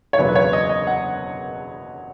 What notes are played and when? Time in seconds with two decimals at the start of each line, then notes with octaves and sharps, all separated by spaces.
0.13 C#5
0.18 F#1 E2 B2 F#3 B4
0.29 B4
0.35 C#5
0.53 D#5
0.69 D#5
0.87 F#5